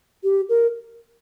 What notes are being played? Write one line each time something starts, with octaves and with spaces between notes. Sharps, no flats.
G4
A#4